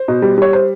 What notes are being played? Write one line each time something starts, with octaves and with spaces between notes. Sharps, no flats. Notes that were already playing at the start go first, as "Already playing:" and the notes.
Already playing: C5
B2
G3
G3 C#5
C5